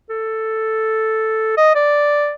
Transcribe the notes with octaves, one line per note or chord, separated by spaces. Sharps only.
A4
D#5
D5